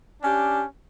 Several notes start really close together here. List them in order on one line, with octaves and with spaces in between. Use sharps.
D4 C#4 G4